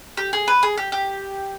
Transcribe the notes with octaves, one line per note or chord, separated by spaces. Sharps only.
G4
G#4
B4
G#4
G4
G4